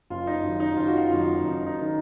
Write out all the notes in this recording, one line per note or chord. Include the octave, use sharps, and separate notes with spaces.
F#1 F4
D#4
F#2 D#3
D#4
F#1 F4
F#4
F4
F#2 D#3 F4
F#1 D#4
D#4
D#3